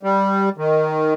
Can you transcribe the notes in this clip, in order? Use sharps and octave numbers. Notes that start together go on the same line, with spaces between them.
G3
D#3